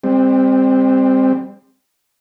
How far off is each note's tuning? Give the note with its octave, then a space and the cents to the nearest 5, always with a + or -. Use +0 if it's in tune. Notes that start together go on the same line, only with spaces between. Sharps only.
G3 +35 C4 +0